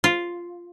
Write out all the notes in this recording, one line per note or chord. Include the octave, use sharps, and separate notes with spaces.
F4